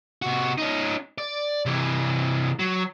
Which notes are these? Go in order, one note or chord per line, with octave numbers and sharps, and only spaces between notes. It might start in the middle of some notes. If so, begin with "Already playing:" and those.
C3 F#4
C#4 D#4
D5
C3 E3
F#3